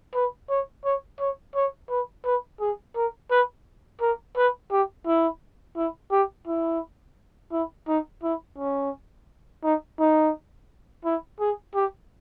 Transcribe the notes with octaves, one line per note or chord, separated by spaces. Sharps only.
B4
C#5
C#5
C#5
C#5
B4
B4
G#4
A#4
B4
A#4
B4
G4
E4
E4
G4
E4
E4
D#4
E4
C#4
D#4
D#4
E4
G#4
G4